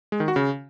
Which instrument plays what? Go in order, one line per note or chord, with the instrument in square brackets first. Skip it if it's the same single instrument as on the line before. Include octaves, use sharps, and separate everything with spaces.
[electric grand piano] G#3
D#3
F#4
C#3